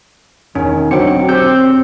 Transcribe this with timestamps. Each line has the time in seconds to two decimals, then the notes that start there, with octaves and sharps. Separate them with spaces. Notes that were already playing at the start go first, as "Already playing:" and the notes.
0.55 E1 D#3 C#4
0.91 D3 F#3 C4 G5 C#7
1.29 C4 G4 E6 G6